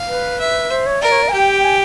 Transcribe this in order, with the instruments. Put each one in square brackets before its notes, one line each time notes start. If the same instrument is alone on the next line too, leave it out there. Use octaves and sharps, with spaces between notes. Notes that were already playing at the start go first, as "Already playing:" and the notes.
Already playing: [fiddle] F5
[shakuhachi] B4
[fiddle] E5
[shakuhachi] C5
C#5
[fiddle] A#4 [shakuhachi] D5
[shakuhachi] C#5
D5
G#5
[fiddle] G4 [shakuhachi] G5
[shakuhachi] G#5